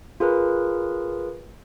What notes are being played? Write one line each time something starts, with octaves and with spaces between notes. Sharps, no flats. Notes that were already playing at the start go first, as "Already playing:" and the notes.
F4 G#4 A#4 B4